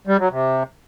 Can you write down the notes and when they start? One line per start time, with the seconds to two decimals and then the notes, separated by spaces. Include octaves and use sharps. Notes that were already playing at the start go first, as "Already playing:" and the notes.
0.07 G3
0.19 F#3
0.31 C3